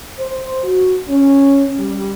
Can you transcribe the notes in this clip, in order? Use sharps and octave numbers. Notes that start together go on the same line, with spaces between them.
C5
F#4
C#4
G3